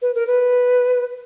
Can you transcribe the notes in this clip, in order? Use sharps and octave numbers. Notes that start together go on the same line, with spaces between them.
B4
A#4
B4